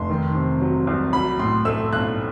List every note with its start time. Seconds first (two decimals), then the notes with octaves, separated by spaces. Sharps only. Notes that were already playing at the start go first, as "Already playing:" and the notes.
Already playing: F1 C6
0.10 D#3
0.35 C3
0.61 F#3
0.87 C2
1.13 F#3 B5
1.39 A2 C6
1.65 A3 E6
1.93 B1 F#6